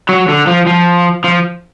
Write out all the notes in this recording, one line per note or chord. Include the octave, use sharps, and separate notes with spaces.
F#3
D3
F3
F3
F3